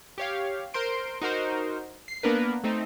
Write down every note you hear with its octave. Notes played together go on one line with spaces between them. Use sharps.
G4 C#5 F5
A#4 C5 C6 D7
D#4 F#4 A#4 C5
C7
A#3 B3 D4 A#4 B4
A3 C4 D#4